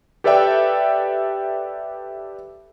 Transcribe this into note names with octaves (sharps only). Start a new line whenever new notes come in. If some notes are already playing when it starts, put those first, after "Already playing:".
G4 A4 B4 D5 E5 G5